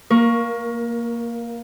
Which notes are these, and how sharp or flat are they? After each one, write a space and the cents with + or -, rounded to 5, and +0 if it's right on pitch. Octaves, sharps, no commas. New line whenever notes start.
A#3 +0 A#4 +25 C#6 +0